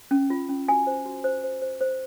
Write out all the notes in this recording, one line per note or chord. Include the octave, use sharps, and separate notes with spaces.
C#4
F4
C#4
F#4 G#5
C5
F#4
C5
C5
C5
C5